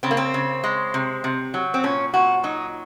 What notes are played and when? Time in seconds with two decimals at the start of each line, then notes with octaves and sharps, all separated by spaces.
0.03 C#3 C4
0.11 A#3
0.17 C4
0.34 C#3
0.64 G#3
0.94 C3
1.24 C3
1.54 F#3
1.74 C4
1.83 A#2 C#4
2.14 A#2 F#4
2.44 F#3 D#4